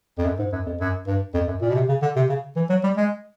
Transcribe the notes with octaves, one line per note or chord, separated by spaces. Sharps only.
F2
F#2
G#2
F#2
F2
F#2
G2
F2
F#2
A#2
B2
C3
C#3
D3
C3
C#3
E3
F#3
G3
G#3